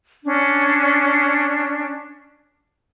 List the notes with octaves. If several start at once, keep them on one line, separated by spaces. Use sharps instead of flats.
C#4 D4